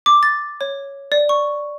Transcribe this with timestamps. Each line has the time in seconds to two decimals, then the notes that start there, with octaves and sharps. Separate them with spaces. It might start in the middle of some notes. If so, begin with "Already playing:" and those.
0.06 D6
0.23 A6
0.61 C#5
1.12 D5
1.29 C#6